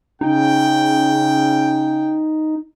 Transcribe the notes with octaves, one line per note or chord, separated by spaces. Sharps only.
C#3 D#4 G5